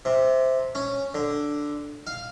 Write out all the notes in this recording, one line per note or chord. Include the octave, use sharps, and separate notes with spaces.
C3
C#4
D3
F5